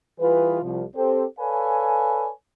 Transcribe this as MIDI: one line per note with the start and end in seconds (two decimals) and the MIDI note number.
0.20 0.61 52
0.20 0.61 55
0.20 0.61 65
0.20 0.61 68
0.20 0.61 71
0.62 0.83 36
0.62 0.83 53
0.96 1.25 60
0.96 1.25 67
0.96 1.25 69
0.96 1.25 72
1.40 2.30 69
1.40 2.30 71
1.40 2.30 73
1.40 2.30 74
1.40 2.30 77
1.40 2.30 80